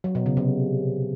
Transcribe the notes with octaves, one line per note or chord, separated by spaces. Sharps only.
F#3
B2
C#3
C3